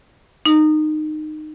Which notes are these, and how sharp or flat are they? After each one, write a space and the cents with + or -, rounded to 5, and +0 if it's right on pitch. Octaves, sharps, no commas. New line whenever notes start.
D#4 -20